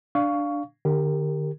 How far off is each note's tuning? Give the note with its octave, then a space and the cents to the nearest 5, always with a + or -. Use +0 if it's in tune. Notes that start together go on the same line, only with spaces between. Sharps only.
D4 +0 F5 +0 C#6 +15
D3 +40 G4 +15 A#4 -10